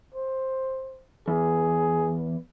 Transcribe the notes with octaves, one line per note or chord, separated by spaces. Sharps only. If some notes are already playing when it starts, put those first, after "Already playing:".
C5
E2 G#4